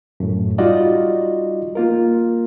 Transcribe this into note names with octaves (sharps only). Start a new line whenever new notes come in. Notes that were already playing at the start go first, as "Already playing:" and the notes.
F#2 A2
G3 D#4 F4 F#4 D5 D#5
A#3 F4 A#4